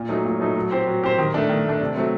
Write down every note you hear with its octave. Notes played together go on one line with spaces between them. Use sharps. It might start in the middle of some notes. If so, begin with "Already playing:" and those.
Already playing: A#2
F#3 A3 D#4
A#2
F#3 A3 D#4
F#3
C4 G4 C5
F#3
C4 G4 C5
D#3
A3 D4
D#3
A3 D4
C3
F#3 A3 C4